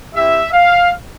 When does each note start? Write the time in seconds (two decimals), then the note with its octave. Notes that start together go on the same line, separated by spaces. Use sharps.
0.15 C4 E4 G4 E5
0.53 F5